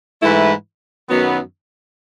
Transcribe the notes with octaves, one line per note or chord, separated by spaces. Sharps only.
G#2 E3 A3 E4 B4
F#2 D#3 F#3 B3